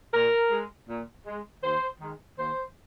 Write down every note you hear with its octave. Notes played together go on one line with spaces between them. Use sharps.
A#2 A#4
G#3
A#2
G#3
D#2 C5
D#3 G#3
D#2 C5